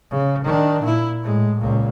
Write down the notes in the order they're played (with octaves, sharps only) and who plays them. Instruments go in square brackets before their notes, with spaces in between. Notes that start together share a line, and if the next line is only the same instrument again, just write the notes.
[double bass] C#3
D#3 D4
A#2 E4
A2 G#3
C#2 A#2